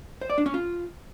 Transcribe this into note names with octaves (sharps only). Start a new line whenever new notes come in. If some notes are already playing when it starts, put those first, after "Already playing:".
C5
D5
D4
C#4
F4